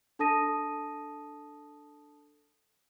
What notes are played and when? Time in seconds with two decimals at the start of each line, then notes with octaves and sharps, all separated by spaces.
0.19 D4 A4 A5 D#6 A#6 D#7